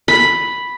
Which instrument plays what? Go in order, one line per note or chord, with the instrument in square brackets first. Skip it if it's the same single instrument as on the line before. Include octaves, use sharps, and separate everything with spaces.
[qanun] B5